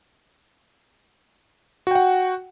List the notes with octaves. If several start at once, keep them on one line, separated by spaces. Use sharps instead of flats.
F#4 F#5 G5